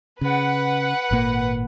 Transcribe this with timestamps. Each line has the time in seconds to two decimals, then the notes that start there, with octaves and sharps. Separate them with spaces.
0.21 C#3 B4 F#5
1.11 G#1 A#2 A#3